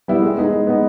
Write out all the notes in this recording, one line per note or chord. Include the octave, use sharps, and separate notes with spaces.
G3 B3 E4
G#3
B3 D#4 G#4
G#3
B3 D#4 G#4